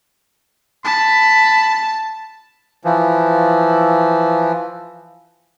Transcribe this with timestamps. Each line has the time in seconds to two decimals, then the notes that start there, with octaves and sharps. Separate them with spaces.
0.85 A5 B5
2.84 E3 F3